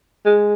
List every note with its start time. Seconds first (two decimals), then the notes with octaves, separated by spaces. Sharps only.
0.26 G#3